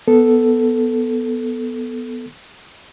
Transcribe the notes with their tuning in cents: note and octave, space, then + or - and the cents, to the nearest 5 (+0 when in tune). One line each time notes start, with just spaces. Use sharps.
B3 +0 A4 +0